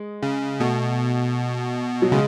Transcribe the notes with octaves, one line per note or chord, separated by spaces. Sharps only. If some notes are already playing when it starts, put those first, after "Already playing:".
Already playing: G#3
C#3
B2 A3
F#3
C#3 G#3